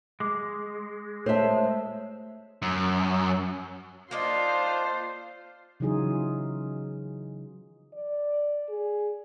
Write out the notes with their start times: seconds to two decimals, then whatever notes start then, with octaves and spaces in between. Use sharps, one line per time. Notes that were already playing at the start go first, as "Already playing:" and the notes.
0.20 G#3 D6
1.26 A3 C5 C#5 E5 A5
2.62 F#2
4.11 A#3 D4 D#4 F4 C5
5.80 C#3 E3 F#3 D#4 F4 G#4
7.93 D5
8.69 G#4